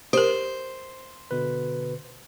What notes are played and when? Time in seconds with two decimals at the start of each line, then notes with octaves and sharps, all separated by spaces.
0.13 G4 A#4 C5
1.31 B2 D3 B4